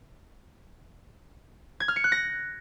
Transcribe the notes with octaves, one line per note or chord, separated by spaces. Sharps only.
G#6
F6
C#7
F#6
A#6